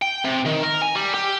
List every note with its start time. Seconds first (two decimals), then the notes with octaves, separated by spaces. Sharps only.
0.02 G5
0.24 C3
0.45 D#3
0.63 A#4
0.82 G#5
0.95 G3
1.14 G4